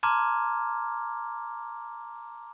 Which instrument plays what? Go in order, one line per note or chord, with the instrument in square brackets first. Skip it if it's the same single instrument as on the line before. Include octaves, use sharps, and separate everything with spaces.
[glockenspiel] A5 A#5 C6 D6 F6 G#6